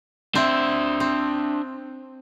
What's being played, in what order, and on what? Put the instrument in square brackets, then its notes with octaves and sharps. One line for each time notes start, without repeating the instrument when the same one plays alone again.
[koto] C4 [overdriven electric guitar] D4 E5
[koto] C4